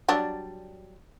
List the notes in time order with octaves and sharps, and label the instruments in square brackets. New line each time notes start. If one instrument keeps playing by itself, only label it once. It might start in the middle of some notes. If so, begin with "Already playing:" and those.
[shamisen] F#3 G3 D4